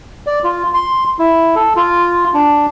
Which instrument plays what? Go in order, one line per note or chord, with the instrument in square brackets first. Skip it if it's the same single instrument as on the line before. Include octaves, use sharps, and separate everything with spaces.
[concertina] D5
F4
C6
E4
A4
F4
D4